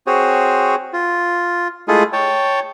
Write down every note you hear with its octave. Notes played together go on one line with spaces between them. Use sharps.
C4 F#4 G#4 C5 C#5
F4
G#3 A3 E4 F4 G#4 A4
C#5 G5 A5